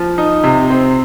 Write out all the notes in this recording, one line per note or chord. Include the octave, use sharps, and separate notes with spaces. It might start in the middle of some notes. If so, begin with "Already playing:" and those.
Already playing: F3
D#4
C3
C4